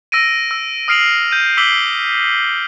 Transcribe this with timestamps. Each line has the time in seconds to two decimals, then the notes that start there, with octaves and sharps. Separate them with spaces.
0.12 E6 A#6 D7 D#7
0.51 E6
0.88 D#6 F6 C7 D7 F7 F#7
1.31 G6 D#7
1.57 D6 E6 B6 C7 F#7 G7